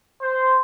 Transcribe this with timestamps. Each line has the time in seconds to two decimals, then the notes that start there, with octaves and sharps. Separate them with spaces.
0.22 C5